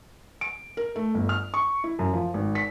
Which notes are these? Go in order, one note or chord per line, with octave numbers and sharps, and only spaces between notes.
D7
A#4
A3
G1
F6
C#6
E4
F#2
F3
G#1
B6